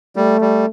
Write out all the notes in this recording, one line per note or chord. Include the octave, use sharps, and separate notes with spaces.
G3 A3
G3